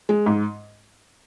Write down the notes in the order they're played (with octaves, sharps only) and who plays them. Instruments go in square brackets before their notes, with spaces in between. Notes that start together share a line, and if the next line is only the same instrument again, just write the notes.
[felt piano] G#3
G#2